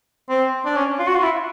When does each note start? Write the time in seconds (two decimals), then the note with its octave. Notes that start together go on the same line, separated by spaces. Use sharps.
0.30 C4
0.65 D4
0.76 C#4
0.99 F4
1.07 F#4
1.15 F4
1.23 E4